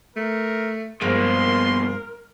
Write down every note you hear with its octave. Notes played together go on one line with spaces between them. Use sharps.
A3 A#4
G2 B2 F3 G#3 A#3 A#4 C6